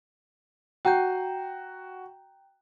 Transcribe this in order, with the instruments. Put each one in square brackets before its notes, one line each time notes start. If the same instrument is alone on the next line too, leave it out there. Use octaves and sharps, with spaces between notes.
[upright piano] F#4 [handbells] G5 A#5 G6